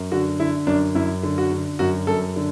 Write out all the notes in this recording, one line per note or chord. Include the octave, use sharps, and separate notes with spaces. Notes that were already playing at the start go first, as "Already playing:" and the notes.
Already playing: F#2
D3 F#4
D3 E4
F#2 D4
F#2 E4
D3
F#4
D3
F#2 F#4
F#2 A4
D3